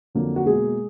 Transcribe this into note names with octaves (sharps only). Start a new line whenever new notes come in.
F2 D3 F#3 A#3
F#4
B2 G#3 A#3 G#4